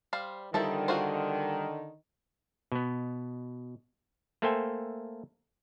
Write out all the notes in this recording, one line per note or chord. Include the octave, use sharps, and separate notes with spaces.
G3 C5 F5
D3 D#3 F3 G3 E4 A4
F4 F#4 C5
B2 B3
A3 A#3 A4 C5 G5 G#5